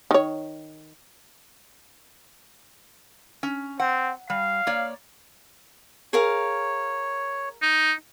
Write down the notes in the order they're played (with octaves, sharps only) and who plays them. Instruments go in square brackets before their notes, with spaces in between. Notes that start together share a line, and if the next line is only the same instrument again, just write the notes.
[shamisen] D#3 C#5
[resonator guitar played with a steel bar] C#4
[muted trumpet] C4 [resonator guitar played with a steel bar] F#5
[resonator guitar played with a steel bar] G3 [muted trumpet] F5
[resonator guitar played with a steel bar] A#3 C#5 D5
[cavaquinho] G#4 A#4 F5 [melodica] C#5
[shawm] D#4